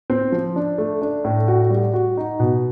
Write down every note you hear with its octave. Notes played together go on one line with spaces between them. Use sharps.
C4
F3
D4
A3
D4
A2
F#4
G3
F#4
D#4
B2